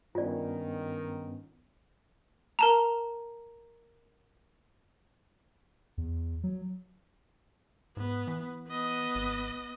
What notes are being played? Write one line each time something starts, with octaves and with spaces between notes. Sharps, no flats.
G2 D#3 B3 C#4 F4 D5
A#4 A5 A#5
E2
F#3
G#2 B3
E3
B3 D#5
G#1